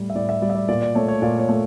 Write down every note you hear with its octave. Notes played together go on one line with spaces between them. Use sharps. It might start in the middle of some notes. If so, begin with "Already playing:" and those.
Already playing: A2 G3
E5
A2 D5
E5
G3 D5
E5
D5
A#2 D5
D5
A3 C#5
C#5
A#2 D5
C#5
A3